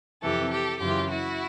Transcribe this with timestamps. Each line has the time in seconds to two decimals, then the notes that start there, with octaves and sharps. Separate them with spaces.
0.22 F2 C3 E3 G4 A4
0.52 G4 A4
0.81 F#2 C#3 E3 F4 G4
1.10 E4 F#4